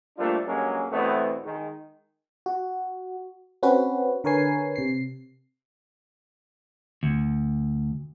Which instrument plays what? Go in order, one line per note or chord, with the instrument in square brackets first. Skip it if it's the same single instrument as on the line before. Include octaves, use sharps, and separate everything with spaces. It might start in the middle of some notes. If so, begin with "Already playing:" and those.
[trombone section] F3 G3 A3 A#3 D4 F4
G2 F#3 G#3 A#3 C#4
E2 B2 F#3 A3 B3 C4
D#3 G#3
[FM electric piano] F#4
C4 C#4 F#4 B4
D3 A#4 B4 C#5 G#5 C7
C3 C7
[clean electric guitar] D2